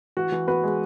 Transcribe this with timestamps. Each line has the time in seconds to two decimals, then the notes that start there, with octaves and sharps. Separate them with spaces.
0.17 E3 F#4
0.32 E3
0.47 B3 F#4 B4
0.63 G#3